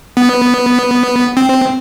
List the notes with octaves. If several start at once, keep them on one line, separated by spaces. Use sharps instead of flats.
B3
C4